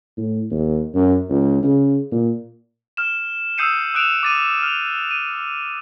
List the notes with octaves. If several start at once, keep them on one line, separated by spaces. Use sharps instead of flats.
A2
D#2
F#2
C#2
C#3
A#2
F6 E7
D#6 E6 G6 C7 C#7 D#7
D#6 F#6 D7 E7 F7
D6 A6 D#7
F6 F7
D#7